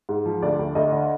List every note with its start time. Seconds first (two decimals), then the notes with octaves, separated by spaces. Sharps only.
0.09 G#2
0.25 F3
0.42 D2 D5
0.59 D2
0.75 D2 D#5
0.92 D3